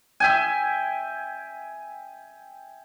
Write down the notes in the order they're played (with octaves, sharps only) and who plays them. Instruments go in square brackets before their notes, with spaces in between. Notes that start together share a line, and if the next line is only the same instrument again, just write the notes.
[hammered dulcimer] E5 G5 G#5